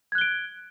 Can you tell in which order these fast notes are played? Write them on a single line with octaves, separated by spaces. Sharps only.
G#6 F#6 G7 D7